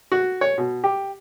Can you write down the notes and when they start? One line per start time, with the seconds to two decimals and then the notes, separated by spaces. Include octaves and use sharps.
0.12 F#4
0.41 C#5
0.58 B2
0.84 G4